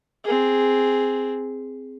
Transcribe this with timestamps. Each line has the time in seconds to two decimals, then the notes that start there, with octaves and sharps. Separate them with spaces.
0.24 C4 G#4